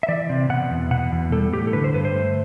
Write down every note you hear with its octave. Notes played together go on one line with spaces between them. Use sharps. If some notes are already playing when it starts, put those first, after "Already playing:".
E5
E3 D5
C3
B2 F#5
E2
B2 F#5
E2
G3 A4
A2 G4
A4
D3 B4
C5
G2 B4
C5
A3